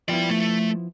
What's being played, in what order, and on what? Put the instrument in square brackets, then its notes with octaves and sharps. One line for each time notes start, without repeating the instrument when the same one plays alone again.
[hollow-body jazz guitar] F3 B3 E4 [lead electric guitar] D5 G5
[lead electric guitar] A3